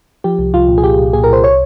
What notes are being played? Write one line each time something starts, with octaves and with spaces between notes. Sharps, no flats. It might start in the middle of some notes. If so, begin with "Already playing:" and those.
F3 G4
C2
C2 F4
A#2
G#4
A#2 G4
C2
A#2 G#4
A#4
C2 C5
C#5